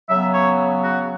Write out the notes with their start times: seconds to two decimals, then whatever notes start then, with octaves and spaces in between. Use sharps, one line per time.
0.09 C#3 F#3 B3 E5
0.34 C#5
0.84 F#4